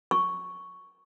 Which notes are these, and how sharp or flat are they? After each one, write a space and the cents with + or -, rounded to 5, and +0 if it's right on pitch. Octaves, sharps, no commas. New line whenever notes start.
C#6 +0